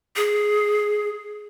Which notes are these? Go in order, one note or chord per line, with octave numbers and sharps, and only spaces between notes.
G#4